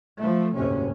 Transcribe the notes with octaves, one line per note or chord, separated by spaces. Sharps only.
F3 A3
F#1 D2 G#2 C3 C#4